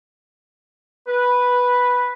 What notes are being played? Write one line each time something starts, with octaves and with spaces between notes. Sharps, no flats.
B4